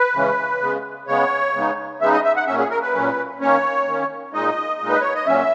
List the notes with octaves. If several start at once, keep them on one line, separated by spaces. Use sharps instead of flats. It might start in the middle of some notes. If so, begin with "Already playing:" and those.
Already playing: B4
C#3 E3 G#3 C#4
C#3 G#3 B3
C#3 G#3 B3 C#5
C#3 G#3 B3 D#4
C#3 G#3 B3 D#4 E5
D#5
E5
F#5
A#2 F#3 C#4 E5
G#4
A#4
B4
A#2 F#3 C#4
D#3 A#3 C#4 C#5
D#3 A#3 C#4
A#2 G#3 D#4 D#5
A#2 G#3 D#4
B4
C#5
D#5
A#2 F#3 C#4 E5